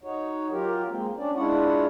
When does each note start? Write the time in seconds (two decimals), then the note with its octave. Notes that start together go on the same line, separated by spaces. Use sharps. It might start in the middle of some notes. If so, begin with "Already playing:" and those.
0.04 D#4 F#4 C#5
0.51 F#3 F4 G4 A#4
0.88 G#3 A#3 C4
1.18 C#4 D4 D5
1.35 G#3 D4 E4 F4 C#5 F#5